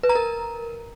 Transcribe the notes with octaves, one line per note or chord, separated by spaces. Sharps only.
B4
A#5
A#4